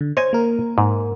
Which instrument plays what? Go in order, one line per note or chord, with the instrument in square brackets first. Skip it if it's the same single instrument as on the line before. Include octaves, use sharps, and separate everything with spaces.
[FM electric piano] D3
[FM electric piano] C5 G#6 [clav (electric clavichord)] C#5 D#5 G#5
[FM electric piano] A#3 A#4
[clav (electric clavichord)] G#2